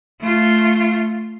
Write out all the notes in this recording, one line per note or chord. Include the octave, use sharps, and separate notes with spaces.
A3 F4